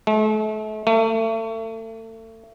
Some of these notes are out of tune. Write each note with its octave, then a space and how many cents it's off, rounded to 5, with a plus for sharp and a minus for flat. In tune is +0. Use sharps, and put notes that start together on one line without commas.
A3 -35
A3 +35